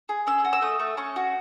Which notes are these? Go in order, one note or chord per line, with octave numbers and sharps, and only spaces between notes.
G#4
C#4 E6
F#4
E6
A3 D#6
A3
C#4 C#6
F#4